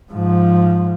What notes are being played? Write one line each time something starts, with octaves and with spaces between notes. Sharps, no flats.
G#2 F3